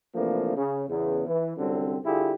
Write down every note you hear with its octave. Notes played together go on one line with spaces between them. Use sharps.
C3 E3 F3 A3 A#3 D4
C#3
E2 C#3
E3
C2 F#2 D3 G3 C4
D3 G3 E4 F4 G4 G#4